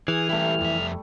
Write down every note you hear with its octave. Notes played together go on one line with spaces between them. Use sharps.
E3 G#4 F6
G3 A3 E4 G4
F2 E5